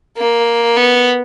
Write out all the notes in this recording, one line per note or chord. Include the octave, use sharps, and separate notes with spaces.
A#3
B3